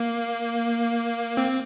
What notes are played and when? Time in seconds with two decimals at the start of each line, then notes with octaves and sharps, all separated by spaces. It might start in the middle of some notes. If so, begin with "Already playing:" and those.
Already playing: A#3
1.37 C4